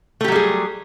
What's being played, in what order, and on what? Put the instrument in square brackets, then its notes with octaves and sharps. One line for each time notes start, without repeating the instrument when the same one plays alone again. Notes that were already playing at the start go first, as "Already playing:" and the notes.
[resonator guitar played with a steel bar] A3
G4
F#3
G3
G#4